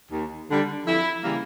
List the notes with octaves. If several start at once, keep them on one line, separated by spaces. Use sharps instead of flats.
D#2
D3 G3
F2 E4
C#3 E3 G3 A#3